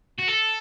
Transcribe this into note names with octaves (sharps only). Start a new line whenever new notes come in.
F#4
A4